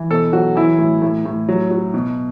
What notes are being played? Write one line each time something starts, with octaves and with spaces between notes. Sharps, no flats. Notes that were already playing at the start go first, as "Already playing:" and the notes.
Already playing: E3
B2 A4
F#3 F#4
E3 E4
A2
A2
A2
F#3
F#3
B2